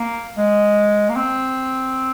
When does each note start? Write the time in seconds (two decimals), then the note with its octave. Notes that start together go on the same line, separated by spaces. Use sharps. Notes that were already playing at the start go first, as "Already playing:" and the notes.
Already playing: A#3
0.37 G#3
1.09 A#3
1.16 C4